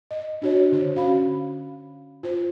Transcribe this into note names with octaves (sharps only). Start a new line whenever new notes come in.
D#5
D4 F#4 C#5
D3 C#5
C#4 F#4 F5 B5
F4 C5